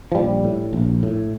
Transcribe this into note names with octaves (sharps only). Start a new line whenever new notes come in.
F3
A#1 G3
A2
A#1
A2